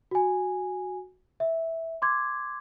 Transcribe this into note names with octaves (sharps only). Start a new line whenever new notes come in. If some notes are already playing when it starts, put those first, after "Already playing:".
F#4 G#5
E5
C6 D6 G#6